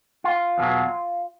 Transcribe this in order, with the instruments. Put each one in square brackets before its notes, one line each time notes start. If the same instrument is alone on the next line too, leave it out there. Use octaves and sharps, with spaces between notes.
[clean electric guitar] F4
E2 B2 F#3